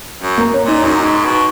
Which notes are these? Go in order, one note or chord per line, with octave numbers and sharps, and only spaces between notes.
F#2
A#3
C#4
A#2 D#4
F#2 D#4
G#2
B2